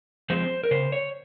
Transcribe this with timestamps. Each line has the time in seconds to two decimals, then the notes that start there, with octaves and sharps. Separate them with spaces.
0.30 F3 G#3 C4 C5
0.63 A#4
0.71 C#3 C5
0.92 C#5